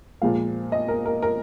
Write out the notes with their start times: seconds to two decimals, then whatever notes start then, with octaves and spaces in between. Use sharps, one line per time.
0.22 A#2 F3 G#3 F5
0.72 D#5
0.88 A#4
1.06 A#4
1.22 A#4